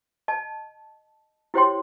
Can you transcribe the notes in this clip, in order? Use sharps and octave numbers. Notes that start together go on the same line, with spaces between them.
D#5 A5
E4 G4 C5 C#5 G5 C6